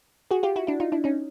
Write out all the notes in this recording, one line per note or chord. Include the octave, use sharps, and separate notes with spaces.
F#4 G#4
F4 G4
E4 F#4
D4 E4
D#4 F4
D4 E4
C#4 D#4